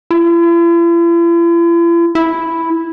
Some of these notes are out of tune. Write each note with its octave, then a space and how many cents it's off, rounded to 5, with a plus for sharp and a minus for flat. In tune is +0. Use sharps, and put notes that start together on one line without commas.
E4 +45
E4 +0